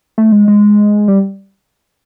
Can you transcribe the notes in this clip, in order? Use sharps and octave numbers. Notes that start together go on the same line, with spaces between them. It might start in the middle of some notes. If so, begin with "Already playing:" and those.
A3
G#3
G#3
G3